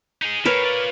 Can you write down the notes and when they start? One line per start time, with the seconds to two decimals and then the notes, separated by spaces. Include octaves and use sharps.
0.22 D#4 G#4
0.45 A2 A#4 B4 C#5
0.64 F4 D5